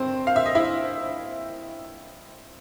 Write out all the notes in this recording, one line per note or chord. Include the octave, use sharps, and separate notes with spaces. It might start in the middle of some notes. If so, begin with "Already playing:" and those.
Already playing: G2 C4 C5
F5
E5
D#5
E4 E5